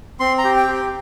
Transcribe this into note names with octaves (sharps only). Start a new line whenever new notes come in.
C4 C6
A#5
G4
G5
G4